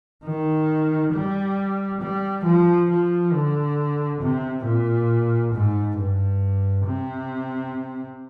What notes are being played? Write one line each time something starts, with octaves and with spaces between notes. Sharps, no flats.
D#3
G3
G3
F3
F3
D3
C3
A#2
G#2
G2
C3